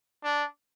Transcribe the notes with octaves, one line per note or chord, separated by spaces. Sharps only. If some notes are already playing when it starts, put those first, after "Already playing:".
D4